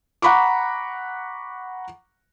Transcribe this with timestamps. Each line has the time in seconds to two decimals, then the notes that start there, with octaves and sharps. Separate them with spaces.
0.22 F#5 A#5 B5 C#6 D6